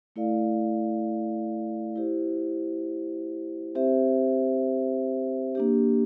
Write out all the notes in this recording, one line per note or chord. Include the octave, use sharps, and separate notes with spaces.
A3 E4 A4 D5 F5
E4 G4 C5
C4 G4 C5 E5
A#3 D4 G4